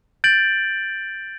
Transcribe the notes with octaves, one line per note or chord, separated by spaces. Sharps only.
G6 A6 D7 F#7